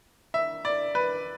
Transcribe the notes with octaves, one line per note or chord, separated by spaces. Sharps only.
E5
D5
B4